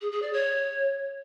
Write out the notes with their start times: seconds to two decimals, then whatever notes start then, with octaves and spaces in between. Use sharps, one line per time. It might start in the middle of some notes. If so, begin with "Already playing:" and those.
0.01 G#4
0.11 G#4
0.22 D5
0.33 C#5